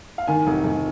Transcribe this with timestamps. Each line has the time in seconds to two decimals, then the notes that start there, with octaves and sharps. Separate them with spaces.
0.18 F5
0.27 D#3 G#5
0.46 F1
0.64 F1